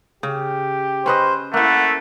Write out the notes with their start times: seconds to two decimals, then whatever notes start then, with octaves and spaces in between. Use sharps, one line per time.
0.23 C#3 G4
1.06 C#4 B4 C5 D#5
1.54 A3 A#3 E4 E5 F#5